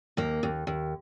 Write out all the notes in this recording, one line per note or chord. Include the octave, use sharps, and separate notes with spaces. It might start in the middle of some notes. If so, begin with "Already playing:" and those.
D#2 A#3
D#2
D#2